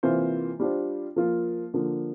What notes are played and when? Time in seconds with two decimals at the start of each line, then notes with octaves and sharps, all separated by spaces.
0.03 C3 E3 A#3 F4 C5
0.60 G3 D4 F4 C5
1.16 F3 A#3 F4
1.74 D3 F3 A#3